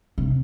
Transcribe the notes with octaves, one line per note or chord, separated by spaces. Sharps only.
C3